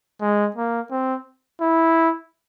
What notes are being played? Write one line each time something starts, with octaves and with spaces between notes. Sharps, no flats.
G#3
A#3
C4
E4